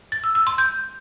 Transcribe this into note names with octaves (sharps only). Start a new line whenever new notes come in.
A6
E6
E6
C6
G6